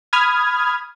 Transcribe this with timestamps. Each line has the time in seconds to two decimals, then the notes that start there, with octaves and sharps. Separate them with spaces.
0.13 B5 D#6 F6 G#6